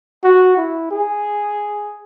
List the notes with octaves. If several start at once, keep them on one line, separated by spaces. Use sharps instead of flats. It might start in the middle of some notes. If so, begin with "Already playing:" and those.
F#4
E4
G#4